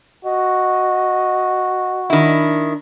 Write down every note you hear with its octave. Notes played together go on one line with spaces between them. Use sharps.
F#4 D#5
D#3 D4 E4